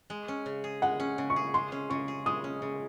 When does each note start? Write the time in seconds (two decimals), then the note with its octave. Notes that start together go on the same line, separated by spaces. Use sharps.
0.10 G#3
0.28 C#4
0.46 C#3
0.64 G#4
0.82 G#3 F#5
1.00 C#4
1.18 C#3
1.30 C#6
1.36 G#4
1.54 G#3 C6
1.72 C#4
1.90 C#3 C#6
2.08 G#4
2.26 G#3 D#6
2.44 C#4
2.62 C#3